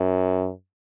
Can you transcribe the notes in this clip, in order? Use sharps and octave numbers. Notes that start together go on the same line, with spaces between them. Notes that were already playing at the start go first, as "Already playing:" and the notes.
Already playing: F#2